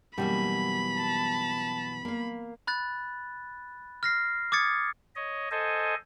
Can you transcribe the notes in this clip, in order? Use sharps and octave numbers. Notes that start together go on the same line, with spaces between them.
F#2 B2 E3 G3 A#3 B5
A5
A#3 F5
B5 F#6 A6
F6 A#6 C7
D6 D#6 G#6 A6 C#7
C#5 D#5
A4 C5 D#5 G#5